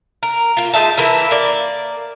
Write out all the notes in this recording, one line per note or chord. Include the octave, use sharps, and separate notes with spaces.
A#4
A#3 F4
G#3 D#4 E5 A5
E3 A#3 E4
A#3 D5